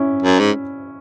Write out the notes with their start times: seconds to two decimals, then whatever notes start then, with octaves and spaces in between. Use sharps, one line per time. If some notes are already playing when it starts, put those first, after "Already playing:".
Already playing: C#4 E4
0.23 F#2
0.40 G#2